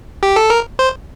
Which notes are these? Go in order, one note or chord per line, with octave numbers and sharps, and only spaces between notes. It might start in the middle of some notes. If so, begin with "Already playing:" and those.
G4
A4
A#4
C5